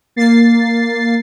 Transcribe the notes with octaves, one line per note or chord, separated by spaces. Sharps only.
A#3 A6 C7